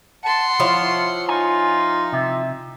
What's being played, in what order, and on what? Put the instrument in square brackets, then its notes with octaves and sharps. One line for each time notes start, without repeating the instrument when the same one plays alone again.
[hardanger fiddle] F#5 C6 [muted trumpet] A5
[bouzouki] F3 E4 C#5 [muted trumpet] F4
[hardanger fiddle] D#4 [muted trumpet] F4 [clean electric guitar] G#5
[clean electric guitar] C3 [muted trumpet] E5